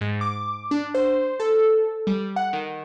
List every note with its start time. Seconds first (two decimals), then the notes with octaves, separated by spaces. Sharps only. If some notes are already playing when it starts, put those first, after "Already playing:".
0.01 G#2
0.21 D6
0.71 D4
0.95 C5
1.40 A4
2.07 G3
2.36 F#5
2.53 D#3